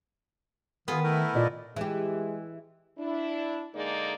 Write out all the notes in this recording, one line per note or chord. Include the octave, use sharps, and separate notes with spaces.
D#3 B3 F4 G#4
A3 E4 A#4
A#2 F4 D5 D#5
E3 G#3 G4
D4 E4
D3 G#3 A#3 D#4 G#4 D5